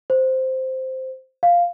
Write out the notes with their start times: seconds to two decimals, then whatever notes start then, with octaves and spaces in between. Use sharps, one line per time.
0.10 C5
1.43 F5